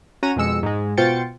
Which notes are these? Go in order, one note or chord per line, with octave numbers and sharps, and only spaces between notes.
C#4 F#4 A#5 D#7
F2 B2 G#3 E6 C#7
G#2 G#3
B2 F4 C5 G5 A6 C#7